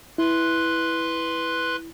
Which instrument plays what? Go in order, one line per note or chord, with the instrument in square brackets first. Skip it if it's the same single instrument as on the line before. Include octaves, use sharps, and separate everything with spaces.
[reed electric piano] E4 [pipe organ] B4 C6 F#6